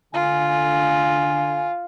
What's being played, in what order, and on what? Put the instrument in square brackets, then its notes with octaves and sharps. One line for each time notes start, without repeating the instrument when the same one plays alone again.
[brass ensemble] D3 G#5 [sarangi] F4